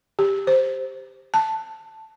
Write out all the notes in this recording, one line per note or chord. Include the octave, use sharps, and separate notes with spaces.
G4
C5
A5